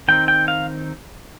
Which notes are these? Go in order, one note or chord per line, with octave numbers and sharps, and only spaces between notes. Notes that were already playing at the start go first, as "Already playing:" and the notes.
D#3 C4 D#4 G5
G5
F5